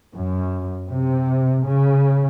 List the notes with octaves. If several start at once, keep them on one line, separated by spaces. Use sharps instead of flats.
F#2
C3
C#3